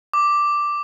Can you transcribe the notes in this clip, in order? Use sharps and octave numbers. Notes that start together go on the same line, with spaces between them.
D6